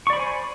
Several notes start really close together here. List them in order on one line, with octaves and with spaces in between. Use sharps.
C#6 D5 B5 C5 G#5